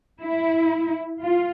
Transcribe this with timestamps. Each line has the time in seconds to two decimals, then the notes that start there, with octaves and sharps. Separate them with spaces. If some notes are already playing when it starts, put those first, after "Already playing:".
0.20 E4
1.22 F4